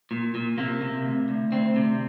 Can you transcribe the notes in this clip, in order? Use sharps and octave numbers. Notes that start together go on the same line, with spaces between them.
A#2
A#2
C3 A#3
C3
D2
D2
D2 C4
C3